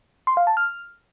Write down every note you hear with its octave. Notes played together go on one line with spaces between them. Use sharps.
C6
F5
A5
F6